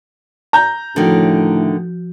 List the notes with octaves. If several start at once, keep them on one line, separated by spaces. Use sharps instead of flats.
A#5 G6
A2 D3 D#3 F3 F#4